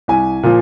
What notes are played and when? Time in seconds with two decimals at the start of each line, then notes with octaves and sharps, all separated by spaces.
0.08 C2 G#5
0.43 A#2 F3